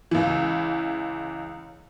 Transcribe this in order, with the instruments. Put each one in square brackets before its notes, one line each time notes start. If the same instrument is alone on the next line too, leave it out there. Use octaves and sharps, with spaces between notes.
[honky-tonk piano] C#2 E3